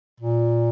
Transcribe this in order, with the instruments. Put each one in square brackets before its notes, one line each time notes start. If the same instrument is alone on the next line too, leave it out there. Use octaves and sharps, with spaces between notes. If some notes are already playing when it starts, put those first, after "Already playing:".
[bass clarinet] A#2